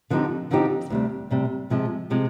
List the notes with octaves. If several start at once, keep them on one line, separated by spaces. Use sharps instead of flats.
D3 F3 C4 D#4 G4
D3 F3 C4 D#4 G4
D2 C3 G3
D2 C3 G3
C3 F3 G#3
C3 F3 G#3